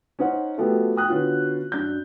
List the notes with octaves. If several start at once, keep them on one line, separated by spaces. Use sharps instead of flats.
C#4 D#4 C5 F#5
F3 A3 B3 F#4 G4
G5 D#6 F#6
D3 B3 C#4 F4 F#4
F#2 D4 G6